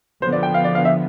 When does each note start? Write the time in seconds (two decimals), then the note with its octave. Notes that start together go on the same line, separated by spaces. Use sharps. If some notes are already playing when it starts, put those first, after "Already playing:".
0.21 D3 F3 B3 C5
0.32 D5
0.43 G5
0.54 F5
0.64 D5
0.75 F5
0.85 E5